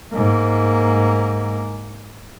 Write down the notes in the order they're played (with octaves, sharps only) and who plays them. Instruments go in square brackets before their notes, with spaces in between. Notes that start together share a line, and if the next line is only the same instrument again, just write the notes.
[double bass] G#2 A#3